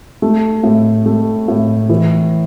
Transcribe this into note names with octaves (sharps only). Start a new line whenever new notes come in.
A3
A2
A3
A2
E3